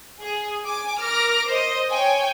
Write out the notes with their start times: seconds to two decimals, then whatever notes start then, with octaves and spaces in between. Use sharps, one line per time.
0.22 G#4
0.64 G#5 D6
1.00 A#4 D6 F6 A#6 D7
1.49 C5 D#5
1.90 C#5 G5 G#5